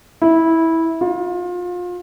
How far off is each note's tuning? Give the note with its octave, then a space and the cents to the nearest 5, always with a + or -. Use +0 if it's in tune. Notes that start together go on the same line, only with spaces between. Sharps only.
E4 -15
F4 +30